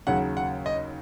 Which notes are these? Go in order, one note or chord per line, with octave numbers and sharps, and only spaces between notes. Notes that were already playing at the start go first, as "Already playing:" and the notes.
D#2 C#3 F#3 F#5
F#5
D#5